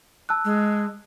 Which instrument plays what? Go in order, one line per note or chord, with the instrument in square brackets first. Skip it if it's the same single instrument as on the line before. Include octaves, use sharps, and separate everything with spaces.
[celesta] A5 E6 F#6
[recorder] G#3